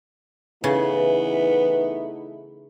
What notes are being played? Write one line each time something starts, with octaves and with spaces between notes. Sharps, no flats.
C#3 E3 A3 B3 D#4 E4